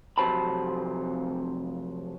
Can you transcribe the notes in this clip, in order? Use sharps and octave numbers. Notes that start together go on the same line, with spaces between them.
F2 C3 F#3 C5 A5 B5